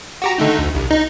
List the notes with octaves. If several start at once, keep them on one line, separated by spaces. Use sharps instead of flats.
F#4 G4 A#5
D3 A3 D#4
D2
C2
D#4